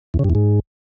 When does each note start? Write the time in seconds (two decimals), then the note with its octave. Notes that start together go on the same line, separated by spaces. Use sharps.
0.14 E2
0.19 C#3
0.24 G2
0.30 E2
0.35 G#2